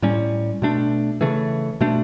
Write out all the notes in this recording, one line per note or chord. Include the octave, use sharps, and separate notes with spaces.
A2 G3 C#4
B2 A3 D4
C#3 E3 A3
B2 A3 D4